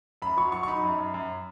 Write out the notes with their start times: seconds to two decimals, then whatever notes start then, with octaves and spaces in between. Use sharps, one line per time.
0.22 F#2 B5
0.37 F#3 C#6
0.52 F#3 C#6
0.63 C#6
0.67 D#4 B5
0.83 F#2
0.98 F#2
1.14 F#2